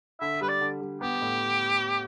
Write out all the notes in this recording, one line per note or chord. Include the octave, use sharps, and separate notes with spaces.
D3 E5
G3 B4
D5
D3
G3
B3 G4
A2